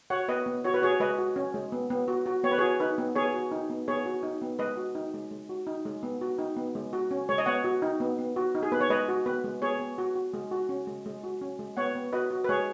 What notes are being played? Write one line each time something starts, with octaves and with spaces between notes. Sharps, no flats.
F#4 C#5 F#5
B3 B4 D#5
B3
F#4 C#5
B4
F#4 G#4 C#5
G#3 B4 D#5
F#4
C#4
G#3
B3
B3
F#4
F#4
B3 C#5
B4
F#4 G#4 C#5
D#4 B4
B3
B3 G#4 C#5
F#4
D#4
B3
B3 G#4 C#5
F#4
D#4
B3
G#3 B4 D#5
F#4
D#4
G#3
G#3
F#4
D#4
G#3
B3
F#4
D#4
B3
G#3
F#4
C#4
G#3 C#5
D#5
B3 C#5 F#5
F#4
D#4
B3
B3
F#4
D#4
G#4
B3 B4
C#5
G#3 B4 D#5
F#4
B3 B4
G#3
B3 G#4 C#5
B3
F#4
F#4
G#3
F#4
C#4
G#3
G#3
F#4
C#4
G#3
B3 C#5 F#5
B3
F#4 B4 D#5
F#4
B4
G#3 G#4 C#5